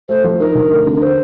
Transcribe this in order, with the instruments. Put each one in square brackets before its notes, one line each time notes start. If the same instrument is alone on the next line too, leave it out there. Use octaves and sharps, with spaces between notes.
[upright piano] A3 [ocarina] C5
[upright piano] F3
[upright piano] D#4 [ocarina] A#4
[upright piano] D2
A3
D3
[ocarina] A#4
C5